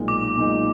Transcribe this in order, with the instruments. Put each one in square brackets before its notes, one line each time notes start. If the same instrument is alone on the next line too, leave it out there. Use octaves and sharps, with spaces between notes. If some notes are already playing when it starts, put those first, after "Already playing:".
Already playing: [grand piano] B1 A#2 G#3 D#4
[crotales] D6
[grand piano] B1 A#2 G#3 D#4